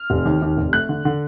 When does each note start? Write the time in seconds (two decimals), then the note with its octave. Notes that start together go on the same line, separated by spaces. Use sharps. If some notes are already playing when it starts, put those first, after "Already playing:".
Already playing: F6
0.10 F1
0.25 D#2
0.42 D#2
0.57 F1
0.73 A3 F#6
0.89 D3
1.05 D3